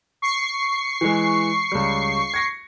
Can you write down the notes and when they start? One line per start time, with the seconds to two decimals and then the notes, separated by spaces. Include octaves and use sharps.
0.22 C#6 C7
1.01 E3 G#3
1.72 C#2 G3
2.34 G#6 A#6 C#7